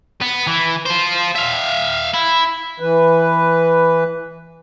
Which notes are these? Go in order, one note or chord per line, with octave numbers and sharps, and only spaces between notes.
B3
E3
F4 C5
E5 F5
E4
E3 B4